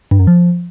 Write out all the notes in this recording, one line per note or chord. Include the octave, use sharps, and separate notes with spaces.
G2
F#2
F3